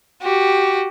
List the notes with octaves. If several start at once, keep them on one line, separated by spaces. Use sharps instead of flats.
F#4 G4